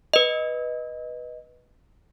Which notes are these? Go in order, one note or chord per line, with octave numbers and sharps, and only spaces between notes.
B4 D#5